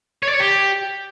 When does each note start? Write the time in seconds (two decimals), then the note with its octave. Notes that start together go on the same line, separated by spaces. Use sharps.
0.23 C#5
0.28 D5
0.34 C#5
0.40 G4